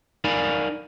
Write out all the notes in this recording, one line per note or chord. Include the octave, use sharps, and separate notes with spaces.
D#4 A#4 D5 F5 G#5 B5